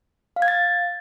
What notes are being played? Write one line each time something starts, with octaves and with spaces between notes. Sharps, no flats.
F5
G#6
A6